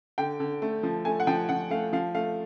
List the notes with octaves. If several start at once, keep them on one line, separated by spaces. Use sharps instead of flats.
D3 G5
D3
A3
F3
A3 G#5
F#5
F3 G5
F3 F#5
A3 F5
F3 F5
A3 F5